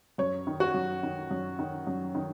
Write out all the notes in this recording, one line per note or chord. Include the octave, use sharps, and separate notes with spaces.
F#2 C#5
D#3
F#4
F#2
D#3
F#2
D#3
F#2
D#3